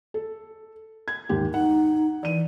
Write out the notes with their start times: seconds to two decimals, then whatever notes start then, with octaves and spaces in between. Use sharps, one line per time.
0.14 A4
1.08 G#6
1.29 D#2 G#2 G4
1.54 D#4 F#5
2.23 E3 D5 D#7